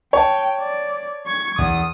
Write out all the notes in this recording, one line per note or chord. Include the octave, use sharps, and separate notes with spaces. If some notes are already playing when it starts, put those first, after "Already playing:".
C#5 G5 A5
D5
C#6 G#6
E2 D#6